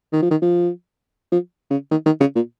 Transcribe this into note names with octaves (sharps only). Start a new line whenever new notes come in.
D#3
F3
D#3
F3
F3
C#3
D#3
D#3
C#3
A#2